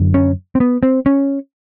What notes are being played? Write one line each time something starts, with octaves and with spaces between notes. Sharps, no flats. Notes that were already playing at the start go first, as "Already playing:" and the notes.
Already playing: F#2 D3
C#4
C4
B3
C4
C#4